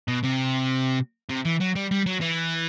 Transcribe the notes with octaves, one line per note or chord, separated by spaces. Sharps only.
B2
C3
C3
E3
F#3
G3
G3
F#3
E3